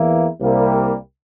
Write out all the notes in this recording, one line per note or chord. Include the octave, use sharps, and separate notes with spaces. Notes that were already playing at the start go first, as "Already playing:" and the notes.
Already playing: E2 E3 A#3 E4
C2 C3 G3 A#3